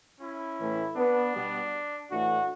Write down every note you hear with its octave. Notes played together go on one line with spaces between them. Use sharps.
C#4 E4
A2 E3 A3
B3 D4
B2 G3 B3
A2 E3 A3 D4 F#4